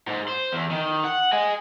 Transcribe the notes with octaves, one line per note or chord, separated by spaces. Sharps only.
G#2
C5
E2
D#3
F#5
D#5 G#5